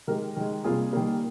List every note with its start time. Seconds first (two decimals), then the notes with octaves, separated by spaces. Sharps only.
0.08 D#3 G#3 G4 A#4
0.37 D#3 G#3
0.64 C3 G3 A#3 F4 G#4
0.93 D#3 G3 A#3